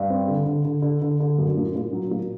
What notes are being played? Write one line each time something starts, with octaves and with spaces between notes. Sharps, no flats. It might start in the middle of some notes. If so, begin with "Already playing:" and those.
Already playing: G2
C4
D3
D3
D3
D3
D3
D3
F#2
A#2
A#2
F#3
A#2